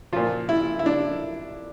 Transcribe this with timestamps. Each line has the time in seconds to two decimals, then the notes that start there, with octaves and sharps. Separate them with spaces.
0.13 A#2 F3 F4
0.49 E4
0.79 E4
0.86 D4